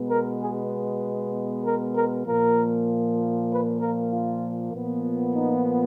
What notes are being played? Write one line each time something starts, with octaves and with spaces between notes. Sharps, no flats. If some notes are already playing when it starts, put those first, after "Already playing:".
Already playing: B2 G#3 B3
A#4
G#4
A#4
A#4
A#2 F3 A#3 A#4
B4
A#4
F4
A#2 F3 B3
D#4